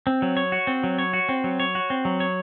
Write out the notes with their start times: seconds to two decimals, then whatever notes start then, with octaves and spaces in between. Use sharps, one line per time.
0.07 C4
0.22 F#3
0.37 C#5
0.52 F#4
0.67 C4
0.84 F#3
0.98 C#5
1.13 F#4
1.29 C4
1.44 F#3
1.60 C#5
1.75 F#4
1.90 C4
2.05 F#3
2.20 C#5